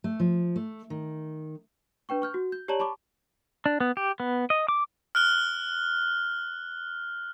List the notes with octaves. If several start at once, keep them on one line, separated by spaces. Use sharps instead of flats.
A3
F3
A3
D#3
D4 B4 G5 C#6
C#6 F6 G6
F#4
G6
G4 C#5 D5 A5 A#5 F#7
A5 B5 C#6 D6
D4
B3
G4
B3
D#5
D6
F6 F#6 G7